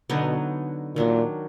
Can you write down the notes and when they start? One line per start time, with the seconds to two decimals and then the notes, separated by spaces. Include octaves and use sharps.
0.10 B2 D3 F#3 B3 D#4
0.96 A#2 D#3 F#3 D4